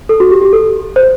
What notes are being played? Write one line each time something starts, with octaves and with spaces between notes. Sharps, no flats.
A4
F#4
G4
G4
A4
C5